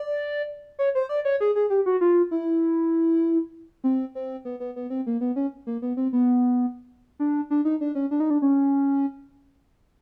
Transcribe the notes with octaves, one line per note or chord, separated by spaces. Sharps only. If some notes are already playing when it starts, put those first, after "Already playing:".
Already playing: D5
C#5
C5
D5
C#5
G#4
G#4
G4
F#4
F4
E4
C4
C4
B3
B3
B3
C4
A#3
B3
C#4
A#3
B3
C4
B3
D4
D4
D#4
D4
C#4
D4
D#4
D4
C#4